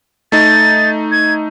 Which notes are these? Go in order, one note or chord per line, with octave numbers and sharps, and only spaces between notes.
A3 D#4 A6
G#6